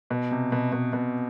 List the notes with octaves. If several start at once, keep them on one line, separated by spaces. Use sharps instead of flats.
B2
C3
B2
B2
B2